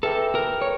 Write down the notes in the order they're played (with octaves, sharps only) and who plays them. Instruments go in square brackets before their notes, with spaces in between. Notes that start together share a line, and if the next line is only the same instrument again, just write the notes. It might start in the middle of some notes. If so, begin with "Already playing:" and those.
[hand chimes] G#4 B4 E5 G5 [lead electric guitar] A4
[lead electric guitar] A#4
C#5